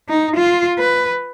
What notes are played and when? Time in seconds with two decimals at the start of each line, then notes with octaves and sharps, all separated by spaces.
0.09 D#4
0.36 F4
0.78 B4